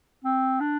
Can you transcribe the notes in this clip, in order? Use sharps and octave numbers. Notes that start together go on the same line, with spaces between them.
C4
D4